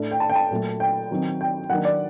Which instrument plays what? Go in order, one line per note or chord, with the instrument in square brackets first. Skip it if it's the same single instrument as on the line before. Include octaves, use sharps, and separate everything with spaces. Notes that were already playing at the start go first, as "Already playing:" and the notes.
Already playing: [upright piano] A2 A3 D4
G5
A5
G5
A5
A#2 F#3 A3
G5
D#3 F#3 C4
G5
D#3 F#3 A#3 D4 F#5
D5